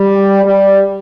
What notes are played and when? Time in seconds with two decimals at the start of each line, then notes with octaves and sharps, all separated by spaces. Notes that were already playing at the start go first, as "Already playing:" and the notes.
Already playing: G3
0.45 G3